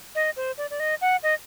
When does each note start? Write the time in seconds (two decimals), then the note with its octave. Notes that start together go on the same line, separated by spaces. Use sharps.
0.15 D#5
0.37 C5
0.58 D5
0.70 D5
0.80 D#5
1.01 F#5
1.23 D#5